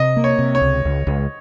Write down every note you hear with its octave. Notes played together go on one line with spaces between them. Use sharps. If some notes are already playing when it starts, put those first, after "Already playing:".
Already playing: C3 D#5
A#3
C#5
C3
C#5
C#2
C#2
C#2